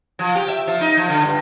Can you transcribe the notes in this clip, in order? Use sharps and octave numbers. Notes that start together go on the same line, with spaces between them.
F3
G4
E5
F3
D#4
F3
D3
G2